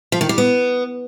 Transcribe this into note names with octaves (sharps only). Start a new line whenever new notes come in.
F3
D#3
G3
B3